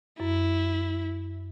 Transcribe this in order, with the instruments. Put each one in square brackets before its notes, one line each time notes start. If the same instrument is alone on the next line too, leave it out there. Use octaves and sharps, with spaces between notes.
[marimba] F#2 [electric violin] E4